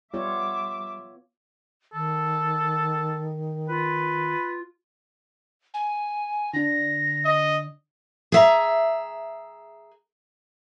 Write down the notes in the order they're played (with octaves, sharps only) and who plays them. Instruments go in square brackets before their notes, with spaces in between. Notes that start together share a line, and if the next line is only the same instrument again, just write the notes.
[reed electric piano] G3 [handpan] B3 F4 C#5 [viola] E5 D6
[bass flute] D#3 [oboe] A4
[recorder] F4 [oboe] B4
[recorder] G#5
[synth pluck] D3 D4 [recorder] A#6
[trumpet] D#5
[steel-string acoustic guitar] G#4 E5 A#5